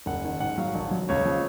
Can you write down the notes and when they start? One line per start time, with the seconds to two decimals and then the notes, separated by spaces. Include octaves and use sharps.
0.06 F#1 F#5
0.24 D#3
0.40 G#2 F#5
0.58 F#3 F5
0.75 A#1
0.91 F#3
1.09 C#2 C#5
1.26 F3